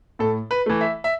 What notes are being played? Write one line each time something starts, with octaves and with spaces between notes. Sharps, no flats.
A2 A4
B4
E3 A3
E5
E5